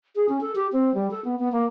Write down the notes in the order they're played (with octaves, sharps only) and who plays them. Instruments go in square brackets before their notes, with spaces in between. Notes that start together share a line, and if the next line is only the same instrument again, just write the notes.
[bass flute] G#4
C#4
A4
G4
C4
G3
A4
B3
B3
A#3